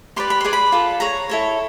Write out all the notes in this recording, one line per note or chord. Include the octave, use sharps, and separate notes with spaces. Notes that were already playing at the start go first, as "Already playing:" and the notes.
G4 B4 D5 C6
B5
G#4 B4 D5 C6
B5
F4 A4 D5
G#4 C#5 A#5
E4 A4 C#5